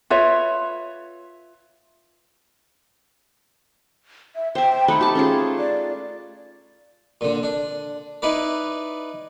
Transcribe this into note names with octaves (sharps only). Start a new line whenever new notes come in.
F4 B4 C#5 E5
E5
C5 E5 G5
A3 D#4 F#5 B5
G4 A5
A3 C#4 F4 G#4
D5
A#2 D3
D4
D#4 E4 B4 D5